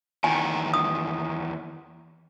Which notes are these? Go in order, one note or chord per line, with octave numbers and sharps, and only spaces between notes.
E2 D#3 G#5
D#6